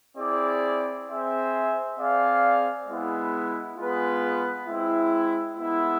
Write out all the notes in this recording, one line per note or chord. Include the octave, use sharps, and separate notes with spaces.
C4 E4 G#4 D5
C4 G#4 C5 E5
C4 G#4 D5 F5
G#3 B3 E4
G#3 B3 F4 G#4 B4
G#3 C4 E4
G#3 B3 E4